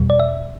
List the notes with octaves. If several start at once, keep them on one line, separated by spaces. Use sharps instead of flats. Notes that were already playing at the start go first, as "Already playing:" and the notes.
Already playing: E2 B2 G3
D5
E5